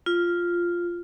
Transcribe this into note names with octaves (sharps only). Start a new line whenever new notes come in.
F4